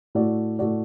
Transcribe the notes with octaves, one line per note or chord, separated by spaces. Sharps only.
A2 A3 F#4 D5
A2 A3 F#4 D5